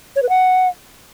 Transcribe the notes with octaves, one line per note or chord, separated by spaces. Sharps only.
C#5
B4
F#5